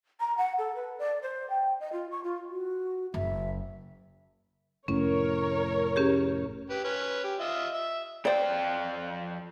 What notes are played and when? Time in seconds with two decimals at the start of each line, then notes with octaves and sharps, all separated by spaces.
0.20 A#5
0.37 F#5
0.58 A4
0.75 B4
0.99 D5
1.22 C5
1.50 G5
1.80 D#5
1.92 F4
2.11 C#6
2.24 F4
2.50 F#4
3.14 F#1 E5
4.88 F1 A2 C#4 A#4 C#5
5.96 C#4 G4 G#4
6.70 G4 B4
6.84 C#4 B4
7.24 G4
7.40 F4 D#5 E5
7.74 E5
8.25 F2 C5 D5 G5